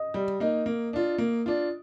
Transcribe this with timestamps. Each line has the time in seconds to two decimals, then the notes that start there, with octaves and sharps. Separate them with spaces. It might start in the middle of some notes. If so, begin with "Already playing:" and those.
Already playing: D#5
0.14 G3
0.40 A#3 D#4
0.66 A#3
0.93 D4 F4
1.18 A#3
1.46 D4 F4